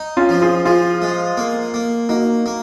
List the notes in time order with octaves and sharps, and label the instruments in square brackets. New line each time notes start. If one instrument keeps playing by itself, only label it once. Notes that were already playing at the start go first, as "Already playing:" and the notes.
Already playing: [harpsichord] D#4
[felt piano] C#4 F4
[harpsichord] F3
[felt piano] F4 G#4
[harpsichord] F3 [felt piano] F4 G#4
[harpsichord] G#3
A#3
A#3
[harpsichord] A#3 [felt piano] D#4 F#4
[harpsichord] A#3